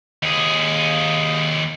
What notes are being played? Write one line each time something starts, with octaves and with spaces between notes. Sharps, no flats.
D#2 G#4